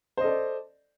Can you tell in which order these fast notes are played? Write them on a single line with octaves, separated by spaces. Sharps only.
C5 D#5 A4 D5